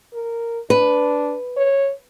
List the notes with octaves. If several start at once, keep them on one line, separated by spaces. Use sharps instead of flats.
A#4
D4 B4
C#5